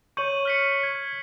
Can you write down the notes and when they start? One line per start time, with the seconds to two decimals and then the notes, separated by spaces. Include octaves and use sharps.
0.17 C#5 C#6 G6 D#7 F#7
0.45 F6 B6 C#7
0.83 G#6